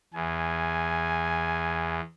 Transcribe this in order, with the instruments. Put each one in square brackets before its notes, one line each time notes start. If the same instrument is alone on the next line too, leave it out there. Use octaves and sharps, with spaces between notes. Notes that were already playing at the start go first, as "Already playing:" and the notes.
[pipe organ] E2 [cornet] G#5